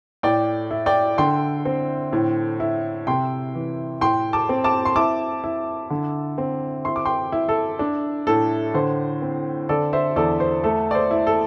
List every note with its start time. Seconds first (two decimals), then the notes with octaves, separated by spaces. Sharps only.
0.23 A2 D5 G5
0.71 E4
0.86 D5 G5
1.18 D3 G5 C6
1.65 C4
2.13 A2
2.60 E4
3.07 C3 G5 C6
3.55 E3
4.01 A2 G5 C6
4.33 A5 D6
4.49 C4
4.64 A5 D6
4.85 C6
4.96 E4 A5 D6
5.44 E4
5.90 D3
6.38 C4
6.85 E4 C6
6.96 D6
7.05 G5 C6
7.32 E4
7.49 A4
7.79 D4
8.27 A2 A4
8.74 D3 C5
9.22 C4
9.69 D3 A4 D5
9.93 C5 E5
10.16 E2 A4 D5
10.40 C5
10.63 A3 A4
10.91 D5
10.95 C5
11.11 E4
11.27 A4